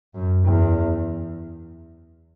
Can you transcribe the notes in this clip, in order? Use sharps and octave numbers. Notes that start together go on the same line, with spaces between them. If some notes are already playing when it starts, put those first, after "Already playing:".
F#2
E2